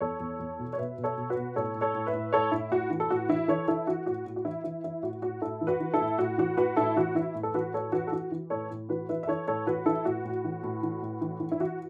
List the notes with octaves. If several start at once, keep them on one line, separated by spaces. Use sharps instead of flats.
E2 A4 C#5
E2
E2
B2
C#5
B2 B4 E5
B2
A4 C#5
B2
F#4 B4
B2
A2 A4 C#5
A2
A4 C#5
A2
B4 E5
A2
A2 A4 C#5
A2 E4
A2 F#4
E3
A4
A2 F#4
E3 E4
E3 A4 C#5
E3 E4 A4
E3 F#4
A2 F#4
A2
F#4
E3 E4
E3 E4
E3 E4
A2 F#4
A2 F#4
A2 E4 A4
E3
F#4 B4
E3
E4 A4
A2
A2 F#4
E3 F#4
A2 F#4 B4
A2 E4 A4
E3 F#4
E3 E4
A2
A4
E3 F#4 B4
A2 A4 C#5
E3 F#4 B4
A4
E3 F#4
E3
A2 A4 C#5
A2
E3 F#4 B4
E3 B4 E5
E5
E3 A4 C#5
A2 A4 C#5
E3 F#4 B4
E3 E4 A4
A2 F#4
A2
E3
A2
E3
A2
E3
E3
E4
E3 F#4